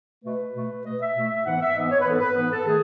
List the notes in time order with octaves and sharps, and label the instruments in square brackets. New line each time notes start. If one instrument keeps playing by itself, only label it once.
[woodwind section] B2 A3 B4
B2 A3
B2 A3 D#5
E5
B2 A3
G#2 E3 B3 F#5
E5
G#2 E3 B3 D#5
C#5
B4
G#2 E3 B3 A4
B4
G#2 E3 B3 B4
A4
D#3 A3 G#4